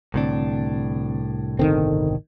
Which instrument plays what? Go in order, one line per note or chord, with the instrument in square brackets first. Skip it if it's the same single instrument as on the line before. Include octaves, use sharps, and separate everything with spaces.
[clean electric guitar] C2 A2 D4 [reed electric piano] D3 C4
[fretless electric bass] G1 D#3 C4 [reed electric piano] D#4 A4